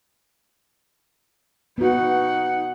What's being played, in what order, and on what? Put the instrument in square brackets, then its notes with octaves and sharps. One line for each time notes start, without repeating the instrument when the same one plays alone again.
[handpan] B3 F#4 [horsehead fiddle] D#4 F#5